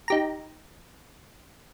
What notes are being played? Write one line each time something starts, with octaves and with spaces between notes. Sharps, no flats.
D#4 G4 A#5